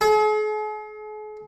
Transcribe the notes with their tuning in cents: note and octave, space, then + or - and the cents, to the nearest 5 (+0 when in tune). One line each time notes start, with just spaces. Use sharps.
G#4 +45